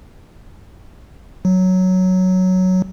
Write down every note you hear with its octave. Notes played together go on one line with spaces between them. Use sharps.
F#3